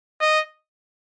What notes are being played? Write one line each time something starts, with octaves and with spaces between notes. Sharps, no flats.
D#5